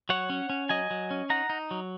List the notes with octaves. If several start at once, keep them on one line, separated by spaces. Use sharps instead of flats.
F#3 C#5 F#5
C#4
C#4
F#3 D#5 G#5
F#3
C#4
D#4 F#5 A#5
D#4
F#3